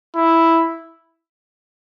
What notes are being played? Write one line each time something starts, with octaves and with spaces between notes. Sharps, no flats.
E4